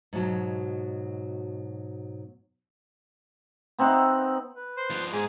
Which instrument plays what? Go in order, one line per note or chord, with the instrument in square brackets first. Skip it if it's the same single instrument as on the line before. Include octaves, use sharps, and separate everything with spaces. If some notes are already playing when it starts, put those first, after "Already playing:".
[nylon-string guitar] G#2 B2 F#3
[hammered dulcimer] B3 C4 D#4 F#5
[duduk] B4
[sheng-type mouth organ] C5
[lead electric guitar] F3 B3
[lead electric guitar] G#2 [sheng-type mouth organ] G#4